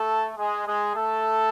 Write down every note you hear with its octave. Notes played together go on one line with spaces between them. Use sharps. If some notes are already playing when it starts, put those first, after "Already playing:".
Already playing: A3 A4
G#3 G#4
G#3 G#4
A3 A4